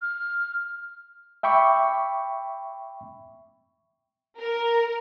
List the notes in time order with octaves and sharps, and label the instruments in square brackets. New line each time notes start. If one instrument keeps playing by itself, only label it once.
[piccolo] F6
[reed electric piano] E5 G5 B5 C#6 D6
[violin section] A#4